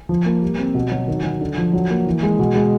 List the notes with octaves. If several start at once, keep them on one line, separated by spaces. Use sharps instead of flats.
F3
A#3
G3
C4
B2
F#3
D#3
F#3
D3
F3
F#3
A#3
E3
G#3
B2
G#3